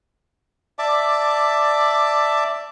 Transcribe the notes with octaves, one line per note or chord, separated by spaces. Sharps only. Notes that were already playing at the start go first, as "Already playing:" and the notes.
D5 E5 A5 D6